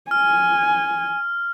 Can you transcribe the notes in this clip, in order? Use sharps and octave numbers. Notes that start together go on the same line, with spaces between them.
G#5 F6